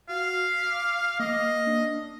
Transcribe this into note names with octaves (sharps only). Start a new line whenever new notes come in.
F#4 F5
B6
D6
A#3 D#5
D4